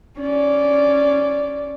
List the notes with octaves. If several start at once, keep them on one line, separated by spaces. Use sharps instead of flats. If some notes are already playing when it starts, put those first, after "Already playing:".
C#4 D5